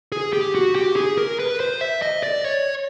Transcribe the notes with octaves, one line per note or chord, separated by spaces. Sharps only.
G#4
G4
F#4
G4
G#4
A#4
B4
C5
E5
D#5
D5
C#5